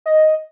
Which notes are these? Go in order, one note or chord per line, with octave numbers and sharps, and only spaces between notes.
D#5